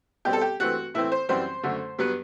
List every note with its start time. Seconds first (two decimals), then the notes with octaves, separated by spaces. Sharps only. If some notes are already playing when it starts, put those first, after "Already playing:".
0.25 B2 G3 C4 G4
0.33 A4
0.41 G4
0.60 G2 E3 A3 C4 F#4
0.94 A2 E3 A3 C4 E4
1.12 C5
1.29 F#2 E3 G3 C4 C5
1.63 F#2 D3 A3
1.99 G2 F#3 B3